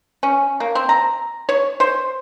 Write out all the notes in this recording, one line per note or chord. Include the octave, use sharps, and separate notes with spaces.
C#4
A#3
C4
A#5
C#5
C5